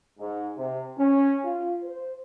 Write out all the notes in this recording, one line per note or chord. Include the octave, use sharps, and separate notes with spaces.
G#2
C3
C#4
F4
C5